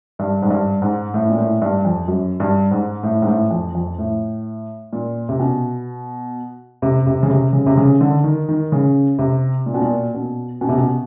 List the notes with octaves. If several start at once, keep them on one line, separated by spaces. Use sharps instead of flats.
G2
G#2
G2
G#2
A2
A#2
A2
G2
F2
F#2
G2
G#2
A2
G#2
A2
F2
F2
A2
A#2
C3
B2
C3
C3
C#3
C3
C#3
C3
C#3
D3
D#3
D#3
C#3
C3
A#2
B2
A#2
B2
B2
C3
B2